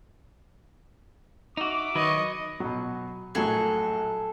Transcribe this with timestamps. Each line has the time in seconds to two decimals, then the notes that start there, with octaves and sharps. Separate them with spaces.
1.57 D#4 F#4 E5 D6
1.95 D#3 F#3 B4 D#5 C#6
2.60 B2 F#3
3.35 A#1 A2 F#3 G#4 A4